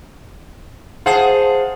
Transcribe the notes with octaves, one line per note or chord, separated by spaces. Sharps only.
G#4 C5 F5 F#5 A5